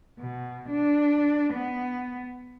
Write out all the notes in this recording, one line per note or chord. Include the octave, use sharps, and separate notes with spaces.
B2
D4
B3